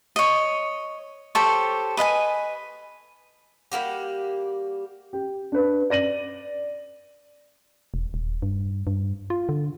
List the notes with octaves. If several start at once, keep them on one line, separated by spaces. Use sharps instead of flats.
C#5 D#5
G4 A4 C5 C#5
B4 D#5 F5 G#5
G3 A#3 F#4 G4
G4
D4 B4
D5 A#6 D#7 F#7
E1
D#1
G2
G2
F4
D3